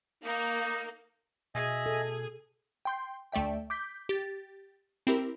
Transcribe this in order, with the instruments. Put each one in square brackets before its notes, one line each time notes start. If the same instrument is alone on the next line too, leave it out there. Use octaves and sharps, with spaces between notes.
[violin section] A#3 [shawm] D#4
[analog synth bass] B2 [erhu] G#4 [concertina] D#5 E5 G#5
[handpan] A4
[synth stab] G5 C6 G6
D2 A3 D5 E5 G5
D6 G6 B6
G4 A6
C4 E4 G4 A#4